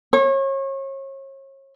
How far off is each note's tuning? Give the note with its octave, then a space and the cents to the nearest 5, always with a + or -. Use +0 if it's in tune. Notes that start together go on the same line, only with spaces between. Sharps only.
C#5 -35